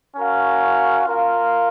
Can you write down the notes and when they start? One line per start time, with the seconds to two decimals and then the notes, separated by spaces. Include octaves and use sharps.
0.15 C#4 F#4 A#4 F5
1.05 F4 A#4 F5